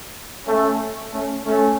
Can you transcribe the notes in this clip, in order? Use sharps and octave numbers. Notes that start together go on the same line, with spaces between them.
A3 C#4
A3 C#4
A3 C#4